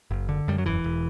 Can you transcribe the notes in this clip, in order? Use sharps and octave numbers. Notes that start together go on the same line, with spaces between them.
F#1
D3
F#2 G3
F#3
E1 E3
E1